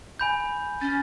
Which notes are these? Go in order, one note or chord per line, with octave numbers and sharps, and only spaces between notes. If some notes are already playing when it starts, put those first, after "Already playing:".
G#5 B5 G6
C#4 A6